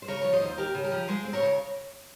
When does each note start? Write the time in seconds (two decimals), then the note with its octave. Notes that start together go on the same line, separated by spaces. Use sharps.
0.02 C5
0.08 C#3 A#4 C#5
0.22 F3 C#5
0.33 C5 D#5
0.41 D#2
0.58 D#2 G4 A#4
0.75 C#3
0.84 G4 A#4
0.92 F3
1.08 G#3 G#4 C5
1.25 C4
1.33 A#4 C#5
1.42 C#3